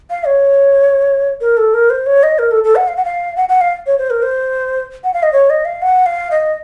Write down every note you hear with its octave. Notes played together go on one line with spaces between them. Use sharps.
F5
C#5
A#4
A4
A#4
C5
C#5
D#5
A#4
A4
A4
F#5
F5
F#5
F5
F#5
F#5
F5
C#5
C5
A#4
C5
F#5
F5
D#5
C#5
D#5
F5
F#5
F5
D#5